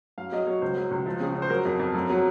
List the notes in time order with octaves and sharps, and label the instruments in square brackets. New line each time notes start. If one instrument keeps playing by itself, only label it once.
[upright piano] F#2 F5
F#3 D#5
F#3 C#5
C#2 C5
F#3
C#2
F3
C#3
C#3
C5
F#3 A#4
F2
F2
F#2
F#3